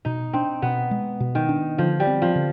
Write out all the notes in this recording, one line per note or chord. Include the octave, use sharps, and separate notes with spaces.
B2 D#4
C4 D4
B2 B3
G#3
B2
D#3
D4
D3 F3
G3
C4
F3
D3